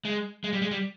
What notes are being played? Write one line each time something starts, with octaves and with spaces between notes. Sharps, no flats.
G#3
G#3
G3
G#3
G3